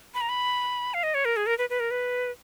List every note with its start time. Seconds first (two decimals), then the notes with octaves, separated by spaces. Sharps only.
0.14 B5
0.21 A#5
0.29 B5
0.94 F5
1.03 D#5
1.14 C#5
1.25 A#4
1.37 G#4
1.46 A#4
1.58 B4
1.70 B4
1.80 A#4
1.91 B4